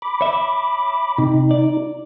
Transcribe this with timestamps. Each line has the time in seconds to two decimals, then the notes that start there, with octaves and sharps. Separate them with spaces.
0.02 B5 D6
0.21 C#5 E5
1.18 C3 D#4
1.51 D5